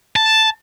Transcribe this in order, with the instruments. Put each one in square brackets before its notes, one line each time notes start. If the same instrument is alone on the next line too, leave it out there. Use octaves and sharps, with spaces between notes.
[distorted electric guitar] A5